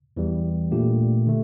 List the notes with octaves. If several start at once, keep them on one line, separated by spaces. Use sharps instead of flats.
E2 E3 G3
A#2 A3 D4 G4
D3 A3